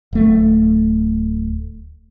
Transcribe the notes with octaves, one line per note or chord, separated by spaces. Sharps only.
D1 A3